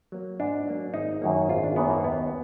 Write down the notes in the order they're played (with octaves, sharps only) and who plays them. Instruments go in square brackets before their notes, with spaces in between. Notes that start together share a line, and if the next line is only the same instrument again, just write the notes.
[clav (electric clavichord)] F#3 A#3
G#2 D4
F#3 A#3
G#1 D#4
F#2 D#3 F#3 A#3
G#1 F4
D4
F#2 D#3 F#3 A#3 B3
A#3
D#2 B3